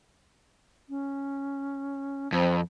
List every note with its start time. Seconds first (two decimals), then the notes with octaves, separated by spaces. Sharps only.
0.89 C#4
2.32 F2 C4